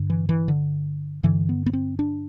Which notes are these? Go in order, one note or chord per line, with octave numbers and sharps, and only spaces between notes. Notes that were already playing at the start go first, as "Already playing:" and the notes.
Already playing: G2 D3
E3
E3
D3
G2 D3 E3
B3
B3
C4
D4